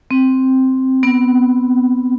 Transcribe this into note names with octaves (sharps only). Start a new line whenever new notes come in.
C4
B3